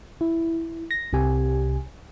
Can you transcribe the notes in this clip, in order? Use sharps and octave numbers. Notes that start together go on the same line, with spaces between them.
E4
A#6
C2 C3 G4 G#5